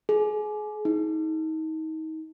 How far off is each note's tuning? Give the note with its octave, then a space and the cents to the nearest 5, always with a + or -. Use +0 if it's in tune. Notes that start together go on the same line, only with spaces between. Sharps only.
G#4 +30
D#4 +30